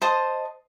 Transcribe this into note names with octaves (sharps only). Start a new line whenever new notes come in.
C5 D#5 A5 D#6